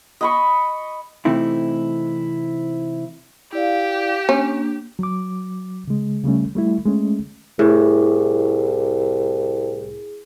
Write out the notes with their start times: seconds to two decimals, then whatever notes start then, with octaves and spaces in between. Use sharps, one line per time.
0.21 D#5 B5 C#6
1.25 C3 E3 A3 C4 D#4 E4
3.53 E4 G4 D5 F5
4.29 A#3 C#4 D4
4.99 F#3 D6
5.88 C#3 G#3
6.24 C#3 G3 A3 C#4
6.55 G3 A3 E4
6.85 G#3 A3 C#4
7.59 C2 A2 G#4